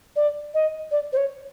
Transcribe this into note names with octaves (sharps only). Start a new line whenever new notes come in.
D5
D#5
D5
C5
C#5